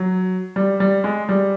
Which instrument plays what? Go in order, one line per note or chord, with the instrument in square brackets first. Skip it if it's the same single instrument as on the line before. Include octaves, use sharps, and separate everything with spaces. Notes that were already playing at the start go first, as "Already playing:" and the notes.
Already playing: [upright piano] F#3
G3
G3
G#3
G3